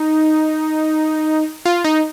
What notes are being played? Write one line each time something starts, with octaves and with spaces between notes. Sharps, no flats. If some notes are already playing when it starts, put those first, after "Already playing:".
Already playing: D#4
F4
D#4